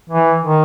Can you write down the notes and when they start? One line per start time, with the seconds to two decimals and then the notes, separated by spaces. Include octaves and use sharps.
0.10 E3
0.44 D#3